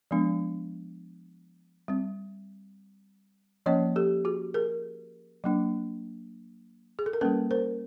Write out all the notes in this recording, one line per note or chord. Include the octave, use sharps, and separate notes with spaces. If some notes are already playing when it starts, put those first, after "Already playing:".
F3 G#3 B3 D4
G3 C4
F3 A#3 C#4 C#5 D#5
G4 A4
F#4 G#4
G#4 A#4
F#3 A#3 D4
G#4
A4
A#4
G3 A#3 C#4 A4 B4
A#4 C5